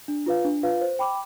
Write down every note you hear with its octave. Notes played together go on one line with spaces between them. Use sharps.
D4
F4 B4 F5
D4
F4 B4 F5
C5
G5 B5 D6